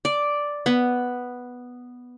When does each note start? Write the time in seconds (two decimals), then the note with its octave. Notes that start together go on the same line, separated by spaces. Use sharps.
0.05 D5
0.66 B3